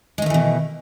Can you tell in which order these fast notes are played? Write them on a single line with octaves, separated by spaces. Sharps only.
G#3 D#3 A3 E3 B2